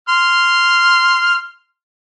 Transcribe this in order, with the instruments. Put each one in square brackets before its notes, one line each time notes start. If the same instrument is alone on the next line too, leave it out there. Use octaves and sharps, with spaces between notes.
[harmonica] C6 F6